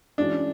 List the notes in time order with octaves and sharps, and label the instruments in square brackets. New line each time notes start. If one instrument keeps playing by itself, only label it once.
[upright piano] E3 G#3 C#4 F#4 [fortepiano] D4